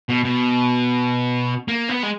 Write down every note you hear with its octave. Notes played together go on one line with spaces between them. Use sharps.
B2
B2
A#3
B3
G#3